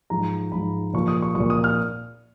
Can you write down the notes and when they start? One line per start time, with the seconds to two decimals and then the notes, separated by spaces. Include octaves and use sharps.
0.10 G#2 F3 A#5
0.52 G#2 F3 B5
0.93 A#2 F3 C#6
1.08 D#6
1.22 C#6
1.35 A#2 F3 C#6
1.50 D#6
1.64 F6